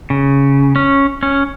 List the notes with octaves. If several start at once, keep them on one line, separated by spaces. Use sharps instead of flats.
C#3
C#4
C#4